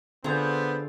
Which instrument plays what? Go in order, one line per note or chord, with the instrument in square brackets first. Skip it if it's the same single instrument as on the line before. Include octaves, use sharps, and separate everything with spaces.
[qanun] D3 A#5 [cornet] B3 [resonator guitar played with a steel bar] C4 F4 G#4 [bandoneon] C5